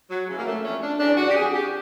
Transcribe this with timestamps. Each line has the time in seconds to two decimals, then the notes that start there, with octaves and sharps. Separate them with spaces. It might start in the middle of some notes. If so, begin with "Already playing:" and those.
0.10 F#3
0.28 C#3 E3 G#3
0.37 A#3
0.46 A3
0.63 F2 C#4
0.82 D4
1.00 C#3 E3 D4
1.17 F#4
1.29 G4
1.36 F2 G#4
1.54 G4